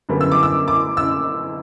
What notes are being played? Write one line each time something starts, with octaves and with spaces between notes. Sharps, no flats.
F#2 D3 G3 B3
E6
D6
E6
D6
E6